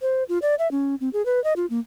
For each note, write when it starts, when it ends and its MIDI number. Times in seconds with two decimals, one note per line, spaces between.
0.02 0.23 72
0.29 0.38 65
0.42 0.55 74
0.59 0.70 76
0.71 0.95 61
1.01 1.09 60
1.13 1.24 68
1.26 1.42 71
1.44 1.53 75
1.56 1.66 65
1.70 1.79 58